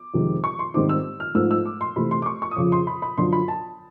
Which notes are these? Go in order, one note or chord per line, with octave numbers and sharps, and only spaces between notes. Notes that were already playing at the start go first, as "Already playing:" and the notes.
Already playing: D6
F2 C3 D#3 G#3
C#6
C6
G#2 D#3 G3 C4 D#4 D6
E6
F6
G#2 F3 A3 E6
E6
D6
C6
C3 E3 A3 B5
C6
D6
C#6
C#6
D#6
F2 C#3 F3 D6
C6
B5
B5
F#2 D3 F3 C6
B5
A5